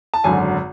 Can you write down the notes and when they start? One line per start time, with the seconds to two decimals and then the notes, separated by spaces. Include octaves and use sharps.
0.14 A5
0.24 G#1 F#2 D3 G#5